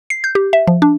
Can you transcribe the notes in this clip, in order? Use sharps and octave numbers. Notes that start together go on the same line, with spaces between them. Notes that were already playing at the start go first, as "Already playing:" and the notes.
C7
G6
G4
E5
F3
D4